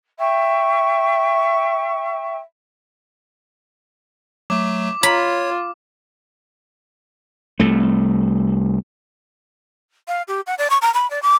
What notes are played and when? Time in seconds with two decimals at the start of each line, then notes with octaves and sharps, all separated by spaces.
0.18 E5 G5 C#6
4.50 F#3 A3 D6
5.03 F4 C#5 B5
7.60 C2 A3
10.08 F5
10.28 G4
10.47 F#5
10.58 D5
10.70 C#6
10.82 A#5
10.94 B5
11.10 D5
11.23 D6